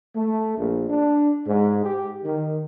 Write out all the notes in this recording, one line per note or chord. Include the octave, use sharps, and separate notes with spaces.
A3
A#1
D4
G#2
G4
D#3